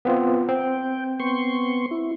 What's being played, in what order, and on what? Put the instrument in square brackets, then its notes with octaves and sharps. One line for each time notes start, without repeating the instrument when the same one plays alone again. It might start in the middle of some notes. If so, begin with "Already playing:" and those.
[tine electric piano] B3 C4 F4
[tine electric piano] C4 [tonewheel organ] G5
[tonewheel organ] B3 C6 C#6
E4